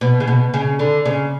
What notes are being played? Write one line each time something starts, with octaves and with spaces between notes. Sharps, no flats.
B2
C#3
B2
C#3
D3
C#3